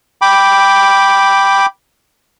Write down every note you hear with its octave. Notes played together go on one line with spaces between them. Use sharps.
G5 B5 D6